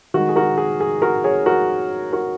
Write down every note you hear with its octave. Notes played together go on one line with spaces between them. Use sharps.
D#3 G#3 F#4
G#4
F#4 A#4
G#4
G#4
F#4 A#4
G#4 C#5
F#4 A#4
F#4 A#4